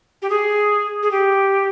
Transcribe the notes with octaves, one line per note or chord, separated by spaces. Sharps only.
G4
G#4
G#4
G4